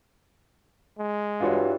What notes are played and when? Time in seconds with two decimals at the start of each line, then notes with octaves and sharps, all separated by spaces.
0.99 G#3
1.40 G2 E3 F4 F#4 C#5